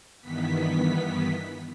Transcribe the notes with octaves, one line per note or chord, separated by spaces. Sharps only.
G2 D#3 E3 B3 B6